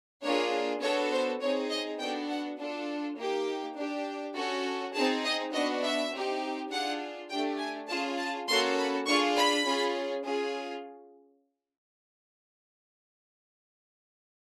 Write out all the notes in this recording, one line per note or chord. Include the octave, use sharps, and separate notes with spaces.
A#3 D4 F4 G#4 C#5
B3 D4 F#4 A4 C#5
C5
C4 D#4 G#4 C#5
D#5
B3 D4 F#4 A4 G5
F#5
D4 F4 A4
A#3 D#4 G4
D4 G4
C#4 F#4 A4
C4 D#4 G#4 A5
D#5
B3 D4 F#4 D#5
E5
C4 D#4 G4
D4 F4 G#4 F#5
A3 D4 G4 G5
G#5
C#4 F4 G#4 A5
A5
A#3 C#4 F#4 A4 C6
B5
D4 F4 G#4 C#6
B5
C#4 F4 G#4
C#4 F4 G#4